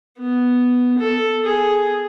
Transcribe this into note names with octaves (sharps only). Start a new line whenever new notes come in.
B3
A4
G#4